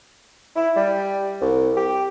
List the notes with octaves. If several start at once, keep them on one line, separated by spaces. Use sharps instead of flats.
E4
G3
C2
G4